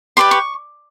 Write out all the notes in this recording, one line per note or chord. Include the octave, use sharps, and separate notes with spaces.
G4 B4 D5 C6
C#6